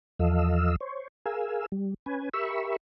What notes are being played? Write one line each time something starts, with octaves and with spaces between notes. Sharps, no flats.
E2 F3 A4 D#5 F5 E6
C5 C#5
G#4 A#4 F5 G#5 E6
G3
C#4 B4 G#5
G4 A#4 E5 B5 C#6 E6